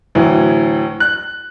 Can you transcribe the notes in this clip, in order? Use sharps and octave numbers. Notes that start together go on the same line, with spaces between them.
D2 A2 E3 F#3
F#6